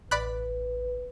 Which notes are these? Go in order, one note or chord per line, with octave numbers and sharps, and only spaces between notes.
A1 B4 D5 B5 F#6